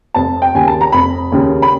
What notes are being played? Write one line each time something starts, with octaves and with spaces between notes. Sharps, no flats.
F1 A5
G5
D#2 C#3 G#5
A5
A#5
F1 B5
D#2 C#3
B5